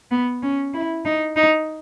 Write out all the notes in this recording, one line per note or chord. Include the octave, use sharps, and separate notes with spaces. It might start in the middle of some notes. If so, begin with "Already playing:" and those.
B3
C#4
E4
D#4
D#4